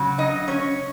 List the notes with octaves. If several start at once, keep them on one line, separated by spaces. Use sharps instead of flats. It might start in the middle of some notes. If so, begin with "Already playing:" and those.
Already playing: C#3 F#3
D#4 D#5
C#4 C#5